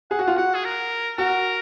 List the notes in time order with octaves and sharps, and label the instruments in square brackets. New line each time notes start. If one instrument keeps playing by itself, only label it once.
[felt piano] G#4 [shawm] F#5
[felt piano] F#4
F4
[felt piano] F#4 [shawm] F#5
[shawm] G#4
A#4
[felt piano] F#4 [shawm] A#4